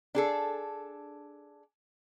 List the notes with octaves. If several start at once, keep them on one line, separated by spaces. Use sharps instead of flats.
D4 G#4 A4